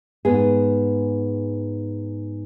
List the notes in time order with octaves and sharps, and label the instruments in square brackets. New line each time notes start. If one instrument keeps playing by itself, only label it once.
[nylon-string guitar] G#2 B3 G#4